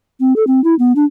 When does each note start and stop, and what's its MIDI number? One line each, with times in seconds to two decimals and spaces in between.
0.20 0.33 60
0.36 0.44 69
0.47 0.63 60
0.64 0.75 64
0.79 0.92 59
0.96 1.04 62